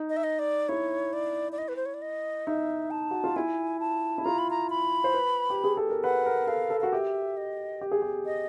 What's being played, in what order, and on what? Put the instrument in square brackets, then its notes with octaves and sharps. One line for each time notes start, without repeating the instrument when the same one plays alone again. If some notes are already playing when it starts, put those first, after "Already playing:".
Already playing: [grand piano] D#4
[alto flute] D#5
E5
D#5
D5
[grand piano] E4 [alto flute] C#5
[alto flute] D5
D5
D#5
B4
C5
C#5
D5
D#5
[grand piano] D#4 [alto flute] E5
[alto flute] A5
[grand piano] F#4
F4
[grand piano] E4 [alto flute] G#5
[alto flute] A5
[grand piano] E4
[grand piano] F4 [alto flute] A#5
[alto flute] B5
A#5
B5
[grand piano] C5
B4
G4
G#4
A4
A#4
[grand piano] B4 [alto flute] F#5
[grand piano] A#4
[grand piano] A4 [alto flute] F5
[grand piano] A4
[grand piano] F#4 [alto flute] F5
[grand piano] G4 [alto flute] E5
[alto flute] D#5
[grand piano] G4
G#4
G4
[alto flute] D#5